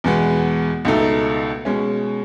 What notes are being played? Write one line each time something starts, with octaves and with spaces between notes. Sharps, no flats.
E2 B2 G#3 B3
C#2 B2 A3 D#4 A4
B2 G#3 C#4